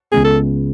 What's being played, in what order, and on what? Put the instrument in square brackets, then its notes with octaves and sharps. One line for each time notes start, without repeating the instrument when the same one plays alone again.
[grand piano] C#2 C#3 G#3 B3 [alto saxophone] G#4
[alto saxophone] A4